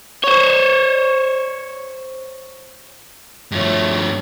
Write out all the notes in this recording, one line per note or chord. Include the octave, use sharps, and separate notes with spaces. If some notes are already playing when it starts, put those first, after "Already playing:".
C5 C#5
G2 F3 A3 C#5